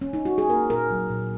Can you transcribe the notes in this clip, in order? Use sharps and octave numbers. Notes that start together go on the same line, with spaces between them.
C#4
D#4
F#4
G#4
A#3 A#4
A#2 A#4
F#3
A#2